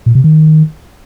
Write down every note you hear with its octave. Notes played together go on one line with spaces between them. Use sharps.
A#2
C3
D#3